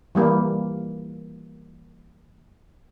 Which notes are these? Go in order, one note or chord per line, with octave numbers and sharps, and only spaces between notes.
E3 G3 A#3